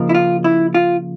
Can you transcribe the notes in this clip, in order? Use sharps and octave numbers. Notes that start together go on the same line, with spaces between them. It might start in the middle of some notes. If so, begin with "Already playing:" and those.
Already playing: C#3 F3 A#3 D#4
E4
F4
E4
F4